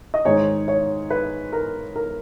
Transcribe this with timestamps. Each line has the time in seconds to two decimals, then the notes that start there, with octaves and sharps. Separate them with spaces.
0.14 D#5
0.25 G#2 D#3 G#3 D#4 C#5
0.68 C#5
1.10 B4
1.53 A#4
1.96 A#4